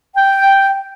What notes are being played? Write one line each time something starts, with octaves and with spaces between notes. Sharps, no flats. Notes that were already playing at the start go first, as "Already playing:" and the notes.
G5